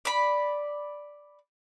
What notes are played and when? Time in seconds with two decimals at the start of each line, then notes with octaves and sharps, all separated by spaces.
0.05 D5 B5